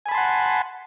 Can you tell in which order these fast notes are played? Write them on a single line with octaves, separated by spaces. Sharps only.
G#5 B5 A5 C6 F#5